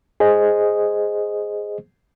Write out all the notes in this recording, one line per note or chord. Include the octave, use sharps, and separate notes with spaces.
G#4 C5 D#5